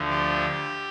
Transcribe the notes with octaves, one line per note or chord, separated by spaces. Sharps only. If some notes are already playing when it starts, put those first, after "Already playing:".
Already playing: D2 D3 F3
G4